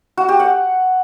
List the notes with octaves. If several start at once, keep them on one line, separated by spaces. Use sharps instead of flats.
F#4
G4
F#5